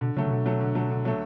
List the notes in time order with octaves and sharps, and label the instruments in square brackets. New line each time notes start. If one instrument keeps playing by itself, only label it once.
[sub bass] B2 [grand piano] D3
[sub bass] C#3 [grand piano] F#3 A3
[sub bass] C#3
[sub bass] B2 [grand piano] D3
[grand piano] F#3 A3
D3
F#3 A3
D3
F#3 A3